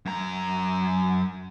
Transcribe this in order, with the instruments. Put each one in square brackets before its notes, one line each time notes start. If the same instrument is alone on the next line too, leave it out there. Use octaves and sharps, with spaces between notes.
[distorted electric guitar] F#2 A#5